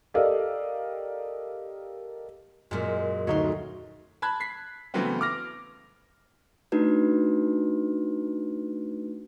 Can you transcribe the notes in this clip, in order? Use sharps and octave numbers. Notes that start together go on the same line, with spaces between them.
G4 A4 A#4 D5 D#5 F5
F#2 A#2 G#3
D2 D#4 F#4 C#5 C6
A5 B5 F#6 G#6
B6 C7
C#3 E3 F#3 A3 B3 C4
D6 F6 A#6
A3 D4 D#4 F#4 B4